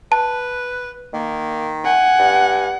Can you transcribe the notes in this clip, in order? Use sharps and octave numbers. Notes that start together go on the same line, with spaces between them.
B4 A5
D#3 A#3
F#5 G#5
G2